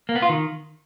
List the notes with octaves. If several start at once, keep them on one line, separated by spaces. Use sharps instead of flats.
A#3
B3
F4
D#3